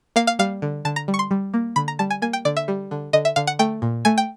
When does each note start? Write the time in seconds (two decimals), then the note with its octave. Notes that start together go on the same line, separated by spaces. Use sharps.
0.16 A#3 F5
0.27 F5
0.39 G3 F5
0.62 D3
0.85 D3 A5
0.96 A#5
1.08 G3
1.14 C#6
1.19 C6
1.31 G3
1.54 A#3
1.76 D3 B5
1.88 A#5
1.99 G3 A5
2.10 G#5
2.22 A#3 G#5
2.33 G5
2.45 D3 D5
2.57 E5
2.68 G3
2.91 D3
3.13 D3 D#5
3.25 E5
3.36 D3 F5
3.47 F#5
3.59 A3 G5
3.82 A#2
4.05 A3 G#5
4.18 G5